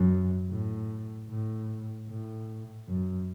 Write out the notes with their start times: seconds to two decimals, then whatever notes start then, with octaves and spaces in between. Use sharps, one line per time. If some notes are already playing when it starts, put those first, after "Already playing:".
Already playing: F#2
0.50 A2
1.30 A2
2.09 A2
2.88 F#2